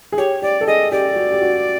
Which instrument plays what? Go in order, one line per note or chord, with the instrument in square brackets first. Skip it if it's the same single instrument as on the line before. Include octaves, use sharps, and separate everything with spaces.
[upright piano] G#4
[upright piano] G4 [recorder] C#5
[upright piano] G4 [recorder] D5
[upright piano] A4
[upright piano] G#4 [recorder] D#5
[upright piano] G4 [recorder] D5
[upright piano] F#4
G4
F#4